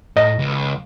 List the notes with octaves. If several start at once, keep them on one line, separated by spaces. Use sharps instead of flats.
A2 D#5
C#2